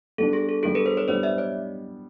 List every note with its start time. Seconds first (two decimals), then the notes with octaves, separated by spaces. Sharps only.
0.18 G3 B3 D4 A4
0.33 G#4
0.49 A4
0.63 G3 B3 D4 G#4 A#4
0.75 A4 B4
0.86 A#4 C5
0.97 B4 C#5
1.08 G3 B3 D4 C5 D5
1.23 D5 E5
1.38 C#5 D#5